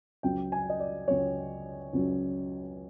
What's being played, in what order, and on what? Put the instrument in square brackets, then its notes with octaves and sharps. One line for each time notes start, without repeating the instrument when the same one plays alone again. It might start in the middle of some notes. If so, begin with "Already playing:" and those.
[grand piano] C#2 C#3 F#3 G5
G#5
D#5
D5
C#2 C#3 F#3 C#5
C#2 C#3 F#3